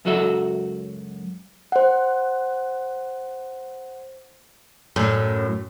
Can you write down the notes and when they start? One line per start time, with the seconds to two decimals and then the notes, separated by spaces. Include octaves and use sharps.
0.05 C#2 F#2 F#3 F#4 A4 E5
1.72 C5 F#5
4.96 F#2 A2